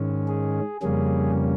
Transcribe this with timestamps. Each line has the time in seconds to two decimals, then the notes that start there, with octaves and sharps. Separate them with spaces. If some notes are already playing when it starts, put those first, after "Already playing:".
Already playing: G#2 D#3 G#3 C#4
0.28 G#4
0.82 F2 C#3 G3 A#3 C#4 G#4